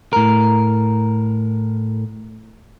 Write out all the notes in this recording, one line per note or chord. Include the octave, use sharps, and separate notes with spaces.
A2 A#4